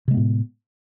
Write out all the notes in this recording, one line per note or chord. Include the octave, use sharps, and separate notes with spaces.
A2 C3 G#3 B3